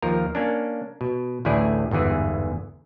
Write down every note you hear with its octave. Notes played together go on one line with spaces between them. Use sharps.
D#2 F3 A#4
A#3 C#4 D4
B2
A1 D2 A2 E4 G#4 D5
G1 E2 G#2 E3 G#4